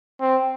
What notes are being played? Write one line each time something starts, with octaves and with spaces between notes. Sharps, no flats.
C4